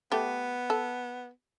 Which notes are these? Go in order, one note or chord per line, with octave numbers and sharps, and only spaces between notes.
A3 B3 G4
A4